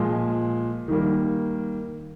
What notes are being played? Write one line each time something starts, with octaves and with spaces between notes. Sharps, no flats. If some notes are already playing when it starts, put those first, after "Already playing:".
Already playing: A#2 F3 G#3
D#3 G3 A#3